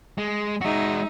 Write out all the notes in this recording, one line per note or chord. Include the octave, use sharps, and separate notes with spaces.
G#3
G#3 D#4 F#4 E5